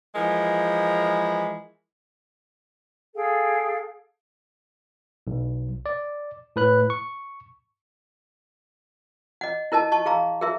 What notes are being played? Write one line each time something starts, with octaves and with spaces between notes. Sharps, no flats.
E3 F3 G#3 A#4
G#4 A4 F5 G5
B1
D5
A2 B4 F#6
C#6
D#5 F#5
E4 A#4 D#5 A5
D#5 A5 C#6
G#4 F5 A#5 C6
G#4 A#4 E5 C6